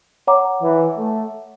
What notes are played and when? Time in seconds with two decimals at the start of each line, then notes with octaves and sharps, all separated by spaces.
0.27 C#5 F#5 A#5 D6
0.62 E3
0.97 A3